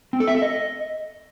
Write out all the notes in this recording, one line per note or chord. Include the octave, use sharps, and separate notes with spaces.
C4
A4
E5
A4
D#5